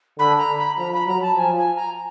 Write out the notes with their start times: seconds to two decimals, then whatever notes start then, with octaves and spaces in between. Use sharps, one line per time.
0.19 D3 B5
0.38 A#5
0.58 B5
0.78 F3 A#5
0.93 B5
1.07 F#3 A#5
1.22 A5
1.37 F3 G#5
1.57 G#5
1.76 A#5